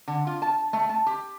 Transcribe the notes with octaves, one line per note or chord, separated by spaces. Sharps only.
D3
F4
A5
A3
A5
G4